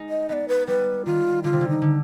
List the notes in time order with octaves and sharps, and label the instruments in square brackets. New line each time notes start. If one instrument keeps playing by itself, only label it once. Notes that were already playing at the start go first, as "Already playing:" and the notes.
Already playing: [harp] G#3 D#4
[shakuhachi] D#5
[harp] B3 [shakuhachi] D#5
[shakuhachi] D5
B4
[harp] G3 [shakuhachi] B4
[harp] D#3 [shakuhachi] F4
[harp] D3 [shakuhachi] F4
[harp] C3
D3
[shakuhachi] D#4
[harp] D3